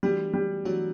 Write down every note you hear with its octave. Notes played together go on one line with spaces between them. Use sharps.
E3 G3 A3 D4 F#4
G3
E3 F#3 A3 D4 F#4